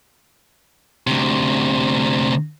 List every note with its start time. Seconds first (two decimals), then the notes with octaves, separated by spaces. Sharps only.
1.07 D2 C3